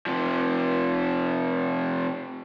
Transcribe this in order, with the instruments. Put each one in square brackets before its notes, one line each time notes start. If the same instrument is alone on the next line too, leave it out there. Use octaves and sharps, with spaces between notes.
[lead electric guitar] C3 F3